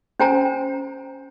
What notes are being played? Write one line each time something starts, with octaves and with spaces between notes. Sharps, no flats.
C#4 C5 G5 G#5 A#5